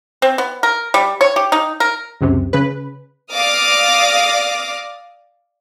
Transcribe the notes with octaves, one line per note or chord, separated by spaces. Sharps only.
C4
B3
A#4
G3
C#5
G4
D#4
A#4
C#2 F#2 C3
C#3 B4
D5 F5 D6 D#6 F6 A#6